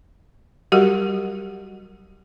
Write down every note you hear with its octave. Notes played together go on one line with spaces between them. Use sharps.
F#3 G3 F#4 G4 A#4 F#5